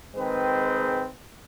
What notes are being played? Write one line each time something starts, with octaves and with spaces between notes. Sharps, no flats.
D#3 G#3 C4 G#4 B4